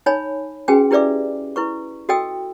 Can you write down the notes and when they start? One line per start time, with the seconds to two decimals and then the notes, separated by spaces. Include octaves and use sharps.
0.06 D#4 C#5 G#5 B5
0.68 C#4 F#4 G#4 B4 G5 G#5
0.91 E4 G4 B4 D5 E5 D6
1.56 E4 B4 C#6
2.09 F#4 A4 D#5 G5 E6